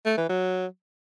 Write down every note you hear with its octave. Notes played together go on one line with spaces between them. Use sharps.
A3
E3
F#3